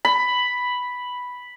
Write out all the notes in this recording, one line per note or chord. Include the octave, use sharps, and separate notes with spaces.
B5